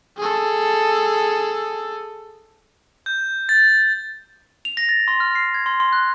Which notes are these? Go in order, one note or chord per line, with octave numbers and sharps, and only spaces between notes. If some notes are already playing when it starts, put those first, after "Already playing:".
G#4 A4
G6
A6
F7
A#6
A6
C6
F6
C7
G#6
C6
C6
F#6